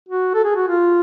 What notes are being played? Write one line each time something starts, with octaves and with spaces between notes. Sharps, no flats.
F#4
A4
G#4
F#4
F4